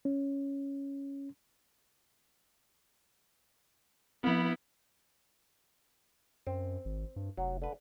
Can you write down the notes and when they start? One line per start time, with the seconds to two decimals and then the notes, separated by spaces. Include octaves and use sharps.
0.05 C#4
4.24 F3 B3 C4 E4
6.47 F#2 C4
6.85 G#1
7.16 G2
7.37 F1 F#3
7.62 D3 B4